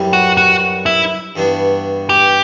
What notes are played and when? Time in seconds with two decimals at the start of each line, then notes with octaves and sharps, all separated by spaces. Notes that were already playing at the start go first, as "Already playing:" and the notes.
Already playing: F#2 E3 G3
0.13 F#4
0.37 F#4
0.86 E4
1.36 G2 E3 B3 D4 F#4
2.09 G4